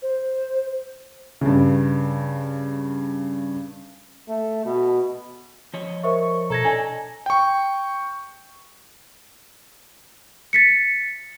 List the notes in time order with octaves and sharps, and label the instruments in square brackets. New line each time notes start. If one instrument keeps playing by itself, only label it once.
[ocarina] C5
[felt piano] G2 C#3
[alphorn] A3
B2
[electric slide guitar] F3 C#5 D#5
[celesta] A#4 C5 E5 [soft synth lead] C#6
[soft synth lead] B2 [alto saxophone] A4 [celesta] A#5 G#6 A#6
[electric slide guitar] D4 C#5 D#5 [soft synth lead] G#5
[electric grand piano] G5 C#6
[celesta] A6 B6 C#7